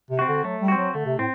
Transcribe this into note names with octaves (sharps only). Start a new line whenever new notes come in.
C3
C4 F#4
D3
F#3 A3
G3
C4 F#4
F#3
D3 A3
C3
A2 C4